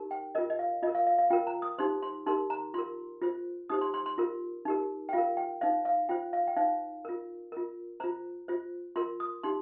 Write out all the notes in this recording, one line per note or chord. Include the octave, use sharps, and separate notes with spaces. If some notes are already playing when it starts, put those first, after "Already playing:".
Already playing: D#4 G4 A#4
G5
F4 A#4 D#5
D#5
F5
F4 A#4 D#5
F5
F5
F5
F4 A#4 G5
A#5
D#6
D#4 G4 C5 C6
C6
D#4 G4 A#4 C6
A#5
F4 A#4 C6
F4 C5
D#4 G4 C5 D#6
C6
C6
C6
F4 A#4
D#4 G4 A#4
G5
F4 A#4 F5
G5
D#4 C5 F5
F5
F4 C5 G5
F5
G5
D#4 C5 F5
F4 A#4
F4 A#4
F4 C5 A#5
F4 C5
F4 A#4 C6
D#6
D#4 G4 C6